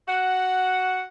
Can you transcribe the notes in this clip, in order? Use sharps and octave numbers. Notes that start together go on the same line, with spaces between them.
F#4 F#5